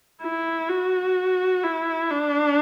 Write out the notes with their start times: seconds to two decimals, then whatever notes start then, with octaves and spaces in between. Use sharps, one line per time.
0.22 E4
0.69 F#4
1.63 E4
2.11 D4